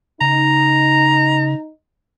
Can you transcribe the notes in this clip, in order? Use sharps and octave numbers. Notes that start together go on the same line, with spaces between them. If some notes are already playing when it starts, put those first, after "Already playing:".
C#3 D#4 A#5